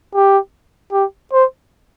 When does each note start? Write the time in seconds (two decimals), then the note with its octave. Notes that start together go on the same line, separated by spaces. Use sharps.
0.14 G4
0.93 G4
1.33 C5